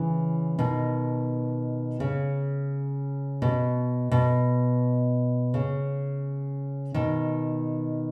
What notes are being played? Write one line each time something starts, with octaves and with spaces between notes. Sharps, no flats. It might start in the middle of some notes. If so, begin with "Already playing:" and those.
Already playing: C#3 E3
B2 D#3
C#3
B2
B2
C#3
B2 D#3